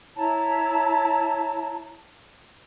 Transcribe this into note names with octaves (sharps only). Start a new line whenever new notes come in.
E4 C#5 A5 A#5